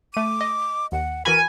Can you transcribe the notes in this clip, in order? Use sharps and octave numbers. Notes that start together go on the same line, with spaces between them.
A3 D6 D#7
D#5
D#2 F#5
E3 F#4 A#4 G#5 B5